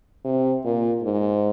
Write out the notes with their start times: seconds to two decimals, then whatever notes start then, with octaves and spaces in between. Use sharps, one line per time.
0.24 C3
0.64 A#2
1.04 G#2